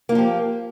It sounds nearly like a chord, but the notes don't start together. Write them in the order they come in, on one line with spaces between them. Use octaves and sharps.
A#3 F4 F3 G4